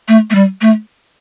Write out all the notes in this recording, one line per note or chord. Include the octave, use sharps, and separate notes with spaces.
A3
A3
G3
A3